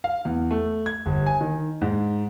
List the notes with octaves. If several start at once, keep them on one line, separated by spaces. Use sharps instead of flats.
F5
E2
A3
G#6
G1
G#5
D#3
G#2